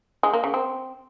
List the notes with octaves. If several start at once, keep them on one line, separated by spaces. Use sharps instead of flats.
G#3
A#3
C#3
C4